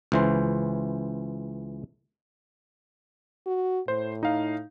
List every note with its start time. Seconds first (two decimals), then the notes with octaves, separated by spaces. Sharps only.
0.12 C#2 E3 C5
3.46 F#4
3.88 A2 C5
4.23 D#4 F5